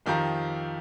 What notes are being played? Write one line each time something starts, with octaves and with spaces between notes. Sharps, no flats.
F2 D#3 F3 G4 F5 A#5